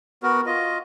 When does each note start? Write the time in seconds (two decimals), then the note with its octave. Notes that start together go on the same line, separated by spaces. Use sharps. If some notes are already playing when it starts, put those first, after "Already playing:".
0.23 B3 F#4 A#4
0.46 F4 D#5